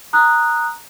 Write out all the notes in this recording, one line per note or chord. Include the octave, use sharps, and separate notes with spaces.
A#5 D#6 F#6